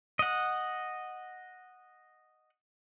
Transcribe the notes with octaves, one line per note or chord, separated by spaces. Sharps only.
D#5 F#5